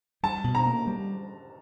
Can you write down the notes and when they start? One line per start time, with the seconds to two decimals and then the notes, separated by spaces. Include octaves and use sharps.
0.23 G3 A5
0.44 B2
0.55 A#5
0.67 A#3
0.87 G3